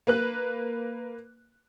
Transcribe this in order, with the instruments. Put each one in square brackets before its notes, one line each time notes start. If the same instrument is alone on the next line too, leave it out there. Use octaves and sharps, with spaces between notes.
[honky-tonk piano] A#3 B4 F#6